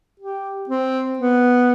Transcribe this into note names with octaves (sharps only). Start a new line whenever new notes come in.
G4
C4
B3